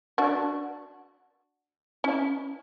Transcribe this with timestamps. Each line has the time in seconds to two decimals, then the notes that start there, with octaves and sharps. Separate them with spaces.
0.18 D4 F#4
2.04 C#4 E4